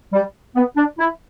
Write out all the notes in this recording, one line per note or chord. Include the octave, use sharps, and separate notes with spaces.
G3
B3
D4
E4